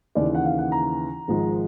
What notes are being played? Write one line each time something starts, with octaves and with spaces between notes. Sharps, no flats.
D#2 C#3 E3 D5
F#5
F5
F#5
A#5
G#1 G#2 F3 G#3